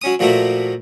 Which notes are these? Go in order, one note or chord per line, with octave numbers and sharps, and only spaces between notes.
F#3 C#4 D#6
A#2 F3 F#3 A3 A#3 F#4